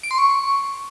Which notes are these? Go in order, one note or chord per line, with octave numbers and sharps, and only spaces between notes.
D7
C6
C#6